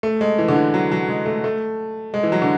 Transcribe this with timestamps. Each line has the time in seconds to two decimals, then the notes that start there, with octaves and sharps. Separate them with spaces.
0.03 A3
0.21 G#3
0.38 E3
0.48 D3
0.56 E3
0.74 F#3
0.92 F#3
1.09 G#3
1.26 A3
1.44 A3
2.14 G#3
2.23 E3
2.32 F#3
2.42 D3